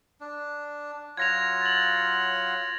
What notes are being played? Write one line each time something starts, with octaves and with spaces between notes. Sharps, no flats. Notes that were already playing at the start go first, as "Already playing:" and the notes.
D4
F#3 F4 F#5 G#6 A#6 F7
A6 F#7